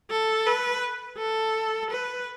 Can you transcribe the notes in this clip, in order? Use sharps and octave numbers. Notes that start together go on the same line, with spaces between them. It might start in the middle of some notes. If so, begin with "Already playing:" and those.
A4
B4
A4
B4